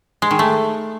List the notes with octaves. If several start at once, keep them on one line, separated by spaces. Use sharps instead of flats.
G#3
D#3
A3